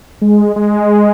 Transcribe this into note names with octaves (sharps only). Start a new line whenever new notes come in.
G#3
G#3